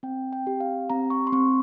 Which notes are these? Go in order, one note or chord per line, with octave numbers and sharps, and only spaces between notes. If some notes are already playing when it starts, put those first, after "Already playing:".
C4 G5
G5
G4
F5
C4 A#5
C#6
C6
C4 C#6